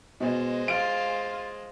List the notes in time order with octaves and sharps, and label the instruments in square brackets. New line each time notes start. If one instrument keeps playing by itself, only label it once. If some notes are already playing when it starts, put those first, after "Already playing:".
[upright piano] B2 [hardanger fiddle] G#3 C5
[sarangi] F4 [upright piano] D7